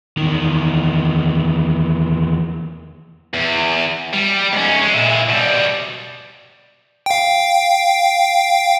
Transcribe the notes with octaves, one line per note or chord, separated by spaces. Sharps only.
E2 D#3
E2
G3
G#2 C#4
G#3
A#2 E4
B2 G3
F5 G5